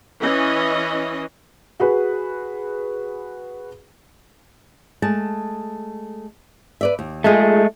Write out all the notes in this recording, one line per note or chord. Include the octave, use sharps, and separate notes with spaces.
E3 C#4 D#5
F#4 G#4 B4
G#3 A3 A5
B4 D5 E5
D#2
G#3 A3 D#4 F4 G#4